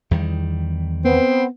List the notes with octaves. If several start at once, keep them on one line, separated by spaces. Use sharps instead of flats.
E2 D#3 G3
B3 C4